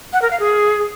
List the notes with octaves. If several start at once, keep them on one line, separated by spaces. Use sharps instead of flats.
F#5
A#4
F5
G#4